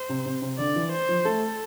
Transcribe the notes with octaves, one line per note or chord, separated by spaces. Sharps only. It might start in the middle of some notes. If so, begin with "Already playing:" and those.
Already playing: C5
C3
C3
C3
D3 D5
E3
C5
F3
A3 A4